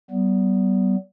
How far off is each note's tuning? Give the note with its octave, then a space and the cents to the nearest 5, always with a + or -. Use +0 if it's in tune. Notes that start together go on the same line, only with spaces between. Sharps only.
G3 -40 B3 +0